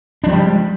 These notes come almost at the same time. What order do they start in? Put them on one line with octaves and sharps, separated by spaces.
D4 F3 G3 G#3